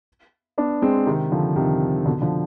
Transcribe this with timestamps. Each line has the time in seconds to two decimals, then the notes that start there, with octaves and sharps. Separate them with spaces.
0.58 B3 D4
0.82 G#3 C4
1.06 C3 D#3
1.32 D3 F3
1.56 C3 D#3
2.06 B2 D3
2.22 D3 F3